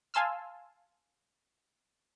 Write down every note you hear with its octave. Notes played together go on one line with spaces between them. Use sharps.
F5 G#5 A5 C6 E6 F6